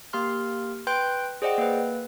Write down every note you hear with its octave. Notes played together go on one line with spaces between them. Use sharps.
A#3 G4 C6 F6
B4 G5 C6 F#6 G6 D7
G#4 C5 D5 D#5 F#5 G5
A#3 B4